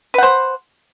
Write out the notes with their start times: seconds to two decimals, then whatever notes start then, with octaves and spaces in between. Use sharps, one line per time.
0.14 B4
0.18 F#5
0.23 C5